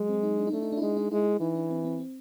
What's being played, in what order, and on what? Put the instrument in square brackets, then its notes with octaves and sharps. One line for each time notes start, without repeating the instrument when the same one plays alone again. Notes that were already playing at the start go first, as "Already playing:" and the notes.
Already playing: [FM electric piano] F#3 [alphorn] G#3
[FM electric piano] C4
D#4
D4
D#4
[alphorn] A3 [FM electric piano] D4
[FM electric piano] D#4
D4
E4
[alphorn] G#3 [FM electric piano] D#4
[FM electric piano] D#4
[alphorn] G#3 [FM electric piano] E4
[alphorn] E3 [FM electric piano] D#4
[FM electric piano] D4
C4
C4
C4